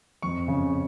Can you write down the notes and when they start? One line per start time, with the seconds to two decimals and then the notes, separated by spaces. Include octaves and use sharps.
0.22 F2 C#6
0.48 C#3